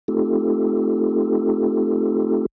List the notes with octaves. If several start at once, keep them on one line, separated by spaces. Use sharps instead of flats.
A3 C4 D#4 F4 G4 A4